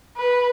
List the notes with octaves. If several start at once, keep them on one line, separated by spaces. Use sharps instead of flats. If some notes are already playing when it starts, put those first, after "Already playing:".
B4